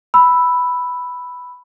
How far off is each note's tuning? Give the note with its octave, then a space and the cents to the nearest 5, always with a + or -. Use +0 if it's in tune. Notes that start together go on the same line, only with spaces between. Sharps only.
B5 +0 E6 +0